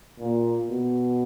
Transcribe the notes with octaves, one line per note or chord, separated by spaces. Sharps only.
A#2
B2